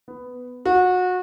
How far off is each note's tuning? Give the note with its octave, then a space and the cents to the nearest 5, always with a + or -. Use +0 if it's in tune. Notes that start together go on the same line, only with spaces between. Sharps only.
B3 +10
F#4 -25